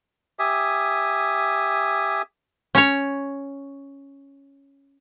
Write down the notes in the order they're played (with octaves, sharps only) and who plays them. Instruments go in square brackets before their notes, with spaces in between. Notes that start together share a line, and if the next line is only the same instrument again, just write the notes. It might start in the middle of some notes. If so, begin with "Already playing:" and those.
[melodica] G4 E5 G#5 D#6
[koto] C#4 C#5